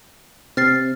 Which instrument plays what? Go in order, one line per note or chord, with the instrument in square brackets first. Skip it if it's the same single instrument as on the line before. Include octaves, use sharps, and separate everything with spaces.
[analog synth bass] C3 [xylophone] F6 A6 C7